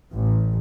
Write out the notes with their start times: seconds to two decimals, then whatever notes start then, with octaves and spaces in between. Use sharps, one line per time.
0.13 A1